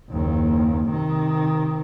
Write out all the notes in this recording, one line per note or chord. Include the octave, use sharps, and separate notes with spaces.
F#1 D#2
C3 D#3